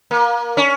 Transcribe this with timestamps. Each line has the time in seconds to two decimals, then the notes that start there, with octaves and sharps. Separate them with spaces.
0.11 A#3
0.57 C#4